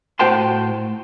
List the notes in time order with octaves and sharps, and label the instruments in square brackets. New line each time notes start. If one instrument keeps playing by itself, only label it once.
[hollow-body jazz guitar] A2 F#4 C5 G5 A5 C6